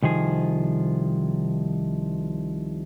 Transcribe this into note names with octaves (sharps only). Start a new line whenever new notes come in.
C2 D#3 F3 G#4